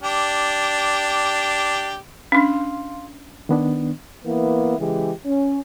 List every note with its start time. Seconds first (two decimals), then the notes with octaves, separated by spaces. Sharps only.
0.02 D4 G4
2.32 C#4 D4 F5 C6
3.49 D#3 B3 D4
4.25 E3 A#3 B3 E4
4.78 C#3 E3 G#3 G4
5.25 C#4